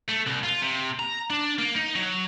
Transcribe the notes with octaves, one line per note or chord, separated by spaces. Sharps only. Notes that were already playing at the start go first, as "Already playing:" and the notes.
A3
C2
F4
C3
A#5
D4
A#3
D#4
F#3